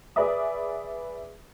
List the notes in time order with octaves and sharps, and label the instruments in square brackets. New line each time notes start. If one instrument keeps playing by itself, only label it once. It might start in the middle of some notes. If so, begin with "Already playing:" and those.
[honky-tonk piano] G#4 B4 D5 E5 D#6